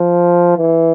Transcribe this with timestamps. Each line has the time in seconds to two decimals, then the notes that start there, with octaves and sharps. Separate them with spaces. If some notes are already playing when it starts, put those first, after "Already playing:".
Already playing: F3
0.57 E3